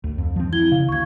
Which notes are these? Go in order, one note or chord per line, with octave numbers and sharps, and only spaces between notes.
D2
F2
F3 C4
E4 G#6 G7
C#3 F5
D2 C#6 G#6